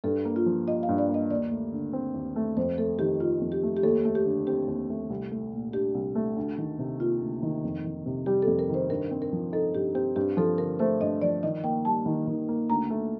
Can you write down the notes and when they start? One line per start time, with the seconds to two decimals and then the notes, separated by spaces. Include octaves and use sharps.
0.04 G2 A4
0.25 A#3
0.36 F4
0.46 F3
0.67 F4 D#5
0.83 F5
0.89 G2
0.98 D5
1.09 A#3
1.14 D#5
1.30 D#2 D5
1.51 A3
1.72 D3
1.93 C4
2.14 D#2
2.36 A3
2.57 F2 C5
2.78 A3 A4
2.99 D#3 G4
3.20 D#4 F4
3.41 F2
3.52 G4
3.63 A3
3.77 G4
3.83 D#2 A4
4.05 A3
4.15 G4
4.25 D3
4.47 C4 G4
4.68 D#2
4.90 A3
5.10 C2
5.31 A3
5.52 A#2
5.73 D4 G4
5.94 C2
6.15 A3
6.37 D2
6.58 D#3
6.79 C3
6.99 A#3 F4
7.21 D2
7.43 D#3
7.64 F2
7.84 D#3
8.06 C3
8.26 G3 G4
8.42 A4
8.47 F2
8.59 A#4
8.69 D#3 C5
8.89 G2 A#4
9.11 C4
9.22 A#4
9.33 F3
9.53 D#4 A4
9.75 G2 G4
9.95 C4 G4
10.16 G2 G4
10.37 F3 A4
10.58 D3 A#4
10.79 A3 C5
11.01 G2 D#5
11.22 F3 D5
11.43 D#3 D#5
11.64 A#3 G5
11.85 G3 A5
12.06 D#3
12.27 D#3
12.48 A#3
12.70 D2 A#5
12.90 A3